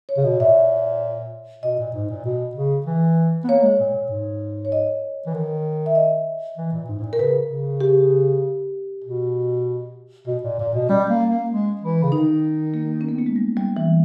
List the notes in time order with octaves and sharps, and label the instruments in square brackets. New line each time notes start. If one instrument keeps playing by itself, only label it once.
[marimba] C#5
[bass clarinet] C#3
B2
[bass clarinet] A#2 [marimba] E5
[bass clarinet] B2 [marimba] D#5
[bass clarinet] A#2
G#2
A#2
B2
C#3
E3
B3
[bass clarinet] A#3 [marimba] C#5
[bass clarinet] G#3
A#2
A#2
G#2
[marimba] C#5
D#5
[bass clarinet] E3
D#3
[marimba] E5
D#5
[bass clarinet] E3
A#2
G#2
G#2
A#2
[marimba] A#4
[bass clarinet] C#3 [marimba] B4
[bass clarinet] C#3
[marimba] G4
[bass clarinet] B2
B2
A#2
A#2
B2
[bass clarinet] G3 [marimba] C#4
[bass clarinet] A#3
A#3
G#3
E3
C#3
[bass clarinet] D#3 [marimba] D#4
[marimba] A#3
C#4
B3
A#3
G#3
G3
G3
E3